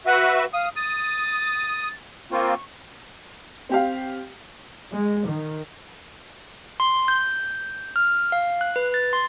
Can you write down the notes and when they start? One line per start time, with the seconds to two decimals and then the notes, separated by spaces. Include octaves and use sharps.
0.06 F#4 B4 E5 F#5
0.53 F5 D#6
0.76 D#6 A6
2.31 A#3 C4 F4 C#6
3.69 C4 G4 F5
4.93 G#3
5.28 D#3
6.80 C6
7.08 G6
7.96 F6
8.32 F5
8.61 F#6
8.76 B4
8.94 A6
9.13 C6